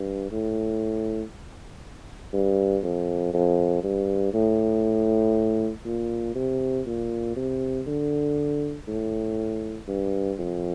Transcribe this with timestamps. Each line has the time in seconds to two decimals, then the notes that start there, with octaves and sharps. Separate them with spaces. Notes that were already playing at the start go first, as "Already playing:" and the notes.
Already playing: G2
0.32 A2
2.33 G2
2.83 F2
3.34 F2
3.83 G2
4.34 A2
5.85 A#2
6.35 C3
6.86 A#2
7.36 C3
7.87 D3
8.88 A2
9.88 G2
10.38 F2